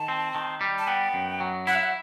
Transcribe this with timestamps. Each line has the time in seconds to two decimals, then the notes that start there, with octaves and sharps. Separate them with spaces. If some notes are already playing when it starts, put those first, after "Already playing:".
Already playing: D#3 A5
0.08 C4
0.35 D#3
0.61 G3
0.78 A5
0.87 B3 G5
1.14 F#2
1.40 F#3
1.67 E4 F#5
1.75 E5
1.83 F#5